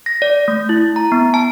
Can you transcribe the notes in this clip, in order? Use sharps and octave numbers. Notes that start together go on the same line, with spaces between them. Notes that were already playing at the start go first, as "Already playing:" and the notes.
A#6
D5
A3
E4
A#5
B3
A5